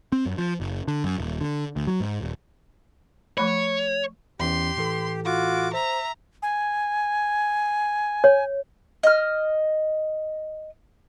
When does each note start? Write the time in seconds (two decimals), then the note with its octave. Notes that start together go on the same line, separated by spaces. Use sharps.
0.12 C4
0.26 F#2
0.38 F3
0.60 F#1
0.88 D3
1.04 F#2
1.18 D#1
1.41 D3
1.76 D2
1.87 F#3
2.00 G#2
2.21 D#1
3.38 F3 A3 C#5 B5
4.40 E2 E3 C#4 G4 C6
4.76 A2 E3 A4
5.25 F4 F#4 D6
5.74 C5 E5 A#5
6.42 G#5
8.24 C#5
9.03 D#5 F6